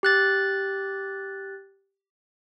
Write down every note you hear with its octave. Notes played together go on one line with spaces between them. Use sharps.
G4 F#6 A6